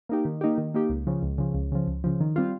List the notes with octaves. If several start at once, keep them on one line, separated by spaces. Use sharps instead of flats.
A#3 D#4 G4
D#3
A#3 D#4 G4
D#3
A#3 D#4 G4
C#2
C#3 F3
C#2
C#3 F3
C#2
C#3 F3
C#2
C#3 F3
D#3
G3 C4 F4